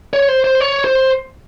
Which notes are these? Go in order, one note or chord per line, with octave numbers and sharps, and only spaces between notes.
C#5
C5
C5
C#5
C5